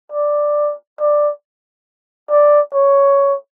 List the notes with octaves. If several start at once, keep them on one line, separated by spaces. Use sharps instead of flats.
D5
D5
D5
C#5